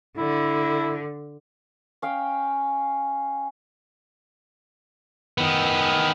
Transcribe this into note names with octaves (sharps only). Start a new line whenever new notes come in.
D3 E4
C#4 F5 G5
D#3 B3